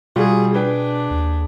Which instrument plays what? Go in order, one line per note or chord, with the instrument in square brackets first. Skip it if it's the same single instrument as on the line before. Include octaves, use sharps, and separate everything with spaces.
[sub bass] B2 [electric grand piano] G3 F4 F#4 [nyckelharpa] G#4
[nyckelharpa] D4 [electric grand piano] G#4 B4 G5
[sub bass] D#2